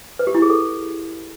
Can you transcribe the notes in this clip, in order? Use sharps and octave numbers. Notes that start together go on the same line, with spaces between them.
B4
G4
E4
G#4
A4